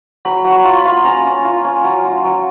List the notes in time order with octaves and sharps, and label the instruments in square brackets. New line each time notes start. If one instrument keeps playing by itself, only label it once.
[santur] F#3 B5
F#3
C#6
F4
B5
F4
C#4 A#5
C#4
F4
C#4
F#3
F4
F#3